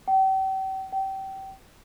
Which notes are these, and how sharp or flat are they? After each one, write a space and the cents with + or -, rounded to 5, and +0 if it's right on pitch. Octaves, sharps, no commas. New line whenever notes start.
G5 -40
G5 -25